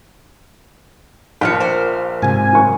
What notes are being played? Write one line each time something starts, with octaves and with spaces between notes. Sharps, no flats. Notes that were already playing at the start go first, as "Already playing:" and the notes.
A#1 F3 G#3 G5 F6 C#7
A#3 C5
G#2 C3 G#5
A1 F#2 C#6